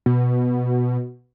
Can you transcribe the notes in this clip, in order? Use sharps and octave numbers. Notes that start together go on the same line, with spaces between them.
B2